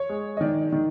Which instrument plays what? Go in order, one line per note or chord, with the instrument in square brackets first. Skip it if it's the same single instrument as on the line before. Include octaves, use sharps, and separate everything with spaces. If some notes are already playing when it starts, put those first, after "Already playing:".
Already playing: [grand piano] C#5
[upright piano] G#3
[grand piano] D#5
[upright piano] D#3 [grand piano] D5
[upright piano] D#3